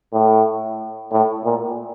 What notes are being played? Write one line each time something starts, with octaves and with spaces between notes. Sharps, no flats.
A2
A2
A#2